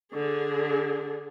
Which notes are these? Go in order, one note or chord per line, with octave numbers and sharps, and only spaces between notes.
D3 G#4